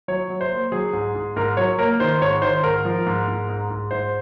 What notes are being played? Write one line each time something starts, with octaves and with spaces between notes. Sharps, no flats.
F#3 C#5
F#3
C5
A#3
F#3 G#4
G#2
G#2
G#2 A#4
F#3 C#5
A#3 A#4
D#3 C5
G#2 C#5
D#3 C5
G#2 A#4
F3
G#2
G#2
G#2
G#2
G#2 C5